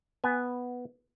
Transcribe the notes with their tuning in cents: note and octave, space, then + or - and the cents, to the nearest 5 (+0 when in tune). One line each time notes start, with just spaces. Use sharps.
B3 +0 G#5 -5